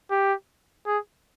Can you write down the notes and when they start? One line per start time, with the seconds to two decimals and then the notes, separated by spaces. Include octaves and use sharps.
0.11 G4
0.86 G#4